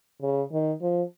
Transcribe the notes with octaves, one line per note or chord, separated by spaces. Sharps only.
C#3
D#3
F3